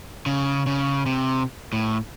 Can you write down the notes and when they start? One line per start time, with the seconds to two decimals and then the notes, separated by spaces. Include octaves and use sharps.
0.26 C#3
0.67 C#3
1.06 C3
1.73 A2